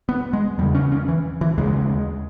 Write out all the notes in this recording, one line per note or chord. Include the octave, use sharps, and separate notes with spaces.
B3
G#3
E2 C#3 G3
C#4
C#4
E3
E3
D#2 C#3 G#3